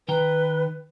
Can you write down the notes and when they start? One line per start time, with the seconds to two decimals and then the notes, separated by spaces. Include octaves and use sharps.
0.08 D#3 B4 G5 A#5